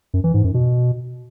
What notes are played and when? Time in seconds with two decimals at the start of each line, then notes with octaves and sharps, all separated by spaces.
0.14 F#2
0.24 E3
0.34 G#2
0.44 F#2
0.54 B2